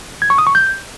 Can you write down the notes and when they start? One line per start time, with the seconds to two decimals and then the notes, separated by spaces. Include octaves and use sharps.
0.22 G#6
0.30 C#6
0.38 D#6
0.47 C#6
0.55 G6